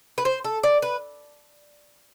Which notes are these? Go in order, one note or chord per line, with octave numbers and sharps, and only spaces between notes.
B4
C5
A4
D5
B4